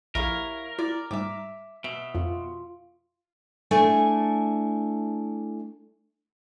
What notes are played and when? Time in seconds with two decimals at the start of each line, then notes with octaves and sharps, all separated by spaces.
0.15 A#1 E4 G4 A#4 C#5 F5
0.79 E4 D5
1.11 G#2 G3 E5 D6
1.84 B2 E5
2.14 F2 F4
3.71 A3 D4 E4 G#5